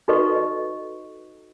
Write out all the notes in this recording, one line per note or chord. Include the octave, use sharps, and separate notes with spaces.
D#4 F#4 A4 B4 D#5 C#6
D#5